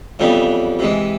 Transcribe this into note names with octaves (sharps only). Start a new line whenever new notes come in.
F2 C#3 E3 G3 B3
C3 E3 G#3